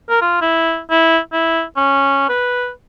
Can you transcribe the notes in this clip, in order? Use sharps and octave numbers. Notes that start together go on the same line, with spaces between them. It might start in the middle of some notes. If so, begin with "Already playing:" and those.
A#4
F4
E4
E4
E4
C#4
B4